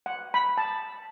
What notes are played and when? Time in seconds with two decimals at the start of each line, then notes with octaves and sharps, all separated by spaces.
0.06 F#5
0.34 B5
0.58 A5